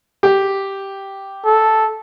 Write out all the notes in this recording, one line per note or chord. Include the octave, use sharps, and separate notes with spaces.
G4
A4